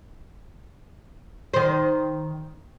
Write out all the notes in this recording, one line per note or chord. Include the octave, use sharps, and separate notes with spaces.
D#3 C5